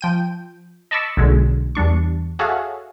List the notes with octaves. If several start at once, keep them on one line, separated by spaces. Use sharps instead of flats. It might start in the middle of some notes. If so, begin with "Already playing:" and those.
F3 G5 D#7
D#5 A5 B5 C#6 D6 E6
B1 D3 F#3 G#3
E2 G3 D4 C#6
F#4 G#4 A4 C#5 E5 F5